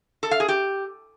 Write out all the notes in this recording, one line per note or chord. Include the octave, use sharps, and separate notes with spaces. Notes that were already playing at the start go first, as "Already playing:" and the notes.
A4
F5
G#4
G4